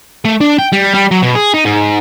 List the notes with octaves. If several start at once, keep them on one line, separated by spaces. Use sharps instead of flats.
A3
D4
G5
G3
G3
F#3
B2
G#4
D#4
G#2